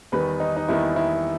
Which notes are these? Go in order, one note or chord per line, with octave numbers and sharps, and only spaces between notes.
E2 D#3 G3 B4
D#4
D#4
E2 D#3 G3 E4
E4